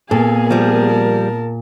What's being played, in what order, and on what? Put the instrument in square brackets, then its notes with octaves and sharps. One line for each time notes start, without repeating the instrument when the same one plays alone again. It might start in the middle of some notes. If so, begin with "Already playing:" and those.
[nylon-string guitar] A#2 [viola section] A#3 B3 G#4 [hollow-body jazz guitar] A4 [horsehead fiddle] F5 G#5
[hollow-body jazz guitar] F3 G3 [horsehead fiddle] A#4 A5